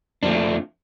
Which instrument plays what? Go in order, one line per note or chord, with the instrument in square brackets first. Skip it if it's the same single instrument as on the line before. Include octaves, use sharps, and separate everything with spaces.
[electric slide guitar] F2 F3 A3 D4